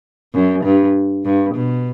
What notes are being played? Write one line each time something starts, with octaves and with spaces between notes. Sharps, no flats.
F#2
G2
G2
B2